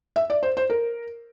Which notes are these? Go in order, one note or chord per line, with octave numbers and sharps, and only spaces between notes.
E5
D5
C5
C5
A#4